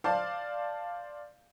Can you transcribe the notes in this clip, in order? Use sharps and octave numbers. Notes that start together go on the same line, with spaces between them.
C5 D5 F5 A5 C6